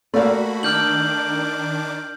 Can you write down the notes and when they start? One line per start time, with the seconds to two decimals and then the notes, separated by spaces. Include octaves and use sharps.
0.14 A3 A#3 F#4 D5 F5 B5
0.63 D#3 D4 D6 F6 G6 F#7